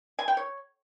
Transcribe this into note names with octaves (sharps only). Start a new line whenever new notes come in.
G#5
G5
C#5